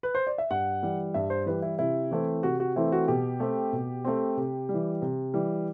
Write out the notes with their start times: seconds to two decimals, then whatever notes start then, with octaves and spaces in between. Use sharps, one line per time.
0.03 B4
0.15 C5
0.27 D5
0.38 E5
0.50 G2 F#5
0.83 E3 G3
1.14 G2 E5
1.30 C5
1.46 E3 G3 B4
1.62 E4
1.79 C3 E4
2.11 E3 A3 C4
2.43 C3 F#4
2.60 F#4
2.76 E3 A3 C4 E4
2.92 F#4
3.08 B2 G4
3.40 A3 C4
3.73 B2
4.04 A3 C4
4.37 C3
4.69 E3 G3
5.02 C3
5.34 E3 G3